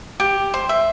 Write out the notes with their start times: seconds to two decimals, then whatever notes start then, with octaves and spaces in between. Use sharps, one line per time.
0.20 G4
0.54 C5
0.69 E5